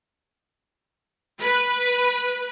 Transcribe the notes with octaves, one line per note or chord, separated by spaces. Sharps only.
B4